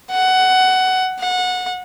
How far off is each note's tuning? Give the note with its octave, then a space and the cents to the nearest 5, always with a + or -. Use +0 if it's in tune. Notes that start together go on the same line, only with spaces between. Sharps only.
F#5 +15
F#5 -20